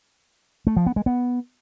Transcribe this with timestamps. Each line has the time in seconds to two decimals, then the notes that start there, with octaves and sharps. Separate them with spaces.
0.67 A3
0.77 F3
0.86 B3
0.96 G#3
1.06 B3